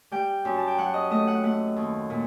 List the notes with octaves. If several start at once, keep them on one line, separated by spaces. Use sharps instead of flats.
G3 G5
F#2
A5
G5
F#3 F#5
D#5
A3 D#5
F#5
A3 F#5
D#2
A#2